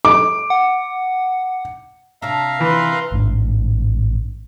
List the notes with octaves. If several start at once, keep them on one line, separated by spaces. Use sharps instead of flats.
D6
F#5
C3 D4 E5 F5 A#5
E3 B4 C6
A1 G#2 D4